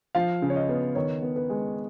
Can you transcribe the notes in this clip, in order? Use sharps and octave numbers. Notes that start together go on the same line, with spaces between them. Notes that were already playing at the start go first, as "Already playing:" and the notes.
F3 F5
C#3
C#5
D#5
B3
D#3 C#5
B3
B4
G#3